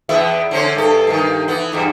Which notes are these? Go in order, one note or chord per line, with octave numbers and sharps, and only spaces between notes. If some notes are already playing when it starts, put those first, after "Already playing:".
E2 B3 E5
D3 C4 C#4
G2 A4
G2 D3 D#3
E3 B3
E2 G2 G3